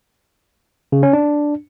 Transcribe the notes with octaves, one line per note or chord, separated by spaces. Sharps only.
C#3
C#4
D4